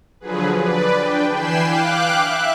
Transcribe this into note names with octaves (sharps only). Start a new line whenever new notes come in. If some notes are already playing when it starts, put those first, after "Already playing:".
D3 F3 F#3 G#4 B4
B4 D5
D4 G5
E3 G5 G#5 B5 C7 E7
F5 G5 D6 F#6
E5 F#6